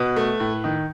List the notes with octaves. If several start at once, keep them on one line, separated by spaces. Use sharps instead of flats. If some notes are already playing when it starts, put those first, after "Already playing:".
Already playing: B2 B4
A3
A2
D#3